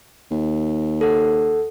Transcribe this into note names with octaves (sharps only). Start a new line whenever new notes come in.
D#2
A4 F#5